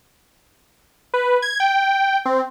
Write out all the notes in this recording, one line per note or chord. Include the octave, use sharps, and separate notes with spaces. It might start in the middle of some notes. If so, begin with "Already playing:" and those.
B4
G#6
G5
C4